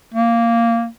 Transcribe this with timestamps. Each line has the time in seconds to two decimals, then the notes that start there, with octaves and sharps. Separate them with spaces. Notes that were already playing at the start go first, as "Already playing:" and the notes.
0.14 A#3